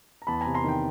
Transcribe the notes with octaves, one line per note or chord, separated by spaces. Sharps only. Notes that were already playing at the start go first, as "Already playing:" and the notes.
A#5
E2 A5 B5
G#5 A#5
C3
A#5 C6
D#3 G5